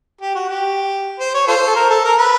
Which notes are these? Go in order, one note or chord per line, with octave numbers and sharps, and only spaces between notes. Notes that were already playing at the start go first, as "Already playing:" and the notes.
G4
F#4
G4
C5
C#5
F4 A4 C5
A4
A#4
A4
A#4
B4